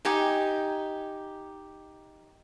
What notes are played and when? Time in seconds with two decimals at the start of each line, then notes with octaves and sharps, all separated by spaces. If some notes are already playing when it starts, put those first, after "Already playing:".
0.05 D#4 G4 G#5